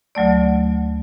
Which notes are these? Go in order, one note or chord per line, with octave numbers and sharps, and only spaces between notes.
D2 F#3 A3 D5